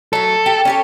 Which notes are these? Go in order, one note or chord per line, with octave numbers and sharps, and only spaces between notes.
F#3 A3 A4
G4
C#4 G4 C#5